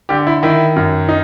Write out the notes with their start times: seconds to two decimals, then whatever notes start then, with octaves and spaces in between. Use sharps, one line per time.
0.09 D3 G4
0.27 E4
0.43 D#3 E4
0.76 F#2
1.09 D#4